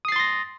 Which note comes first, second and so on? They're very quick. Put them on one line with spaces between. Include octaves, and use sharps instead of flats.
D#6 C7 A6 C6 A#6